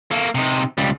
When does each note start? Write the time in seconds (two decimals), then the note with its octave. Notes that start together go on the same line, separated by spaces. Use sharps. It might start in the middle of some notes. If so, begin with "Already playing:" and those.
0.11 A#3 A4
0.35 C3 D#4
0.78 C#2 G3